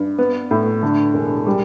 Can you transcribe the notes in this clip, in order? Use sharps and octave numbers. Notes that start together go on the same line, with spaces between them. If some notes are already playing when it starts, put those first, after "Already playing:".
Already playing: G2
B3
A2
D3
E1
G3